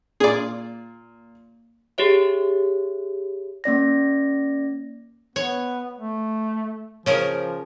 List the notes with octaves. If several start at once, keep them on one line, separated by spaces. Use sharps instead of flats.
A#2 G#4 D5 C6
G4 G#4 C#5 E5
A#3 C#4 D5 A#6
B3 C#5
A3
C#3 F3 C#4 A#4